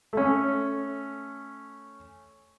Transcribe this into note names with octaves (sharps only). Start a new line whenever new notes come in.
A3 C#4